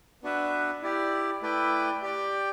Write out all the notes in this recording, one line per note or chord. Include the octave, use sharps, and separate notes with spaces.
B3 D4 F#4 B4 E5
E4 G4 D5
A3 E4 B4 D5 G5
G4 D5 G5